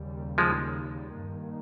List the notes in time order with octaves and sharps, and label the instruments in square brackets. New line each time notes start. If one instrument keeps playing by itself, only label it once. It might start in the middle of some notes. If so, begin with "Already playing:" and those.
Already playing: [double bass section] D#2 C#3 G3
[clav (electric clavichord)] F3 G#3
[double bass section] G2 D#3 A#3